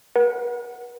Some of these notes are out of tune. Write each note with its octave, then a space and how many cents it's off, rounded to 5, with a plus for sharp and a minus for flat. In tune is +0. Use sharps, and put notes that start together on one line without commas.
B4 -45 F#5 +0